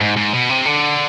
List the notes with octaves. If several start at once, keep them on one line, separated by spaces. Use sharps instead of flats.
G#2
G#2
B2
C3
D3